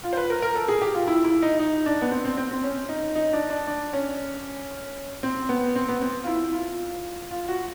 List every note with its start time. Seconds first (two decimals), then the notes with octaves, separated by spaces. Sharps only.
0.03 F4
0.13 C5
0.17 B4
0.30 A#4
0.42 A#4
0.55 A4
0.68 G#4
0.82 G4
0.94 F4
1.07 E4
1.24 E4
1.42 D#4
1.60 D#4
1.86 D4
2.02 B3
2.11 C4
2.25 C4
2.37 C4
2.51 C4
2.64 C#4
2.89 D#4
3.15 D#4
3.33 D4
3.50 D4
3.67 D4
3.93 C#4
5.23 C4
5.49 B3
5.76 C4
5.89 B3
6.01 C4
6.24 F4
6.27 E4
6.53 F4
7.31 F4
7.48 F#4